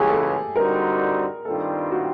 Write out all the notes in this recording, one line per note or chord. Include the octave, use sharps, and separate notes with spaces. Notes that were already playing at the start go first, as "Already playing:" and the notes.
Already playing: C#2 C#3 E3 G4 G#4
A4
D3 G3 C4 D#4 F#4 A#4
G2 D#3 G3 C4 F4 A4
F#4